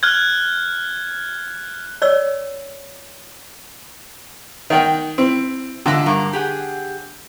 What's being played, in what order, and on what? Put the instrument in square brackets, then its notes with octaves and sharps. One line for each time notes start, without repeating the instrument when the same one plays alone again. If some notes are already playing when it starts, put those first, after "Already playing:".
[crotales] F6 F#6 G#6
[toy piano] C#5 D5 E6
[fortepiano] D#3 F#5 G5
[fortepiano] C4 [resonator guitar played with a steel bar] E4
[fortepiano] D3 [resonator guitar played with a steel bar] F4 D#5 E5
[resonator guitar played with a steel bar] G2 A#3 A#5
G4 G#4 F#5